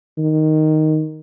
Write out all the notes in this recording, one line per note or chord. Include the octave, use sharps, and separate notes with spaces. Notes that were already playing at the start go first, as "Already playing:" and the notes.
D#3